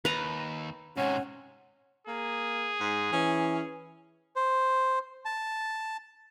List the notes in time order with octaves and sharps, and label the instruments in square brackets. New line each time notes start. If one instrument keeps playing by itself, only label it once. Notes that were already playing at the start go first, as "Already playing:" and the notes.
[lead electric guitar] D#2 [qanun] B4 A#5
[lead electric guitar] G#2 C3 [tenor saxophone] C#4 [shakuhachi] F#5
[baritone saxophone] A#3 [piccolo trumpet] G#4
[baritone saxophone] G#2
[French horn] E3 [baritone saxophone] C#4
[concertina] C5
A5